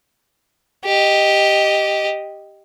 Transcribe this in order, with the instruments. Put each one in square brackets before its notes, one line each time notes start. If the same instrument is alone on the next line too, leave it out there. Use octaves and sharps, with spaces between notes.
[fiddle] G4 D#5